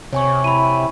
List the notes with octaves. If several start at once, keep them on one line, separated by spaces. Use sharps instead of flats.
C3 C#5 G#5 C#6
E4 B5 D#7